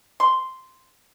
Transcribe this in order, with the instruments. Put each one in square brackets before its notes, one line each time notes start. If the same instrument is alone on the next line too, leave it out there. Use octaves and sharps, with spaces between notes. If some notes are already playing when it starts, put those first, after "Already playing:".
[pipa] C6